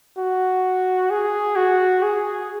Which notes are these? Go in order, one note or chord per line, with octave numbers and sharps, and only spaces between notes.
F#4
G#4
F#4
G#4